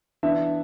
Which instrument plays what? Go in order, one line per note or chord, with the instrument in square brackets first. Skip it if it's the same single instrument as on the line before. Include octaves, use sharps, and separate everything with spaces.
[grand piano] E3 B3 D4 E5